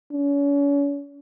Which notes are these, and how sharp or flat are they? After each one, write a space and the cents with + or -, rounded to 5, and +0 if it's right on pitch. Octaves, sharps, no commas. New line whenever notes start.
C#4 +40